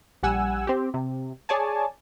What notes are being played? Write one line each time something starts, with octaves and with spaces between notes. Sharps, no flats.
A#1 G3 F#5 G#5 E6
C4 G4
C3
G#4 C#5 D5 G#5 A5